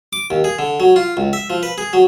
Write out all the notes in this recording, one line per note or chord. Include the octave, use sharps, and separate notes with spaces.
D6
D#2
G#4
D3
F#3
F4
C#2
E5
F3
B4
G#4
F#3